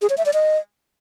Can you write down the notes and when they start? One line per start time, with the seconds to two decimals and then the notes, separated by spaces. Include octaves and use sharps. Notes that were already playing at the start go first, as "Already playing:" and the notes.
0.02 G#4
0.10 C#5
0.18 E5
0.26 D5
0.34 D#5